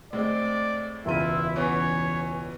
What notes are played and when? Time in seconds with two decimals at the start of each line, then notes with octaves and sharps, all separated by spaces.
0.13 A2 G#3 C4 D5
1.06 E1 C#2 E4 F4 E5 D#7
1.56 E3 B3 C#4 C#5 G#5